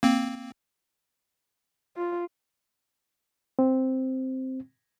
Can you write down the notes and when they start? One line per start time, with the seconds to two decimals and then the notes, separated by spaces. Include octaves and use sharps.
0.03 A#3 C4
1.97 F4
3.59 C4